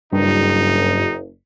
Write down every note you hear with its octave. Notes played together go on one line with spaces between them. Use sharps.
F#1 G2 D#4